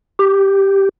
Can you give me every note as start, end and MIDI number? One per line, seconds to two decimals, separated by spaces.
0.19 0.89 67